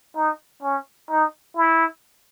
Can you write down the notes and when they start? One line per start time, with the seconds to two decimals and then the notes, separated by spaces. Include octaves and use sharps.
0.16 D#4
0.62 C#4
1.10 D#4
1.57 E4